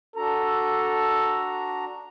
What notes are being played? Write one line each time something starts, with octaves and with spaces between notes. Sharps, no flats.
D4 F#4 A4 A#5